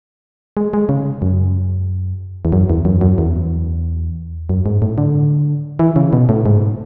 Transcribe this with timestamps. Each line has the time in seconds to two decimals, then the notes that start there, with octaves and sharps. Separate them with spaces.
0.57 G#3
0.74 G#3
0.89 C#3
1.22 F#2
2.45 E2
2.52 F#2
2.70 E2
2.85 F#2
3.01 F#2
3.18 E2
4.49 F#2
4.66 G#2
4.82 A2
4.98 D3
5.79 E3
5.96 C#3
6.13 B2
6.29 A2
6.46 G#2